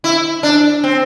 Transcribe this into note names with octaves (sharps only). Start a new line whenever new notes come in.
E4
D4
C4